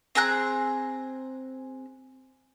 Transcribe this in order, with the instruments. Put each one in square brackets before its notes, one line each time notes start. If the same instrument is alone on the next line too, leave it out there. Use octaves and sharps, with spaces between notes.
[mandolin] C4 G#4 A#5 F#6